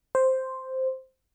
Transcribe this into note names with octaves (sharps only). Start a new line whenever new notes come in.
C5